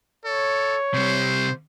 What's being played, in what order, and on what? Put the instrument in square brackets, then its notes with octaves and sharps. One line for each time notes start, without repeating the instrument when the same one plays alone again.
[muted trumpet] A4 [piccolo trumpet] C#5
[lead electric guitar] C3 G3 [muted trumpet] C5